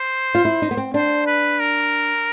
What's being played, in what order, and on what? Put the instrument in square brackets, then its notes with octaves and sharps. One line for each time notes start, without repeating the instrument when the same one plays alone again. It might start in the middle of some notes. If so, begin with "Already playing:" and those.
Already playing: [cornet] C5
[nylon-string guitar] F4
E4
D#4
B3
C4
[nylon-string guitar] D4 [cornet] C5
[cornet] B4
A#4